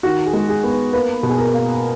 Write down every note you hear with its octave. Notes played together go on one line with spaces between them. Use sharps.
D#3 F#4
G#4
G#3
G#4
B3
B4
A#3 B4
B2
G#4
A#4
A#3